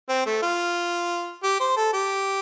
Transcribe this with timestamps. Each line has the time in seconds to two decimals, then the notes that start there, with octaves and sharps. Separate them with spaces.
0.09 C4
0.26 A3
0.43 F4
1.43 G4
1.60 C5
1.77 A4
1.93 G4